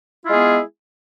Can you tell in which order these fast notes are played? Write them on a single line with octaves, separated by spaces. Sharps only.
E4 F4 G#3 G#4 B3